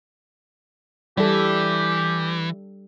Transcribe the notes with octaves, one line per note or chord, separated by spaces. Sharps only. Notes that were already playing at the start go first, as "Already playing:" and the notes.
E3 G3 G4 A4